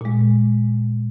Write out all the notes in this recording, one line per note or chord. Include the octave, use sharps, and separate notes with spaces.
A#2 G#3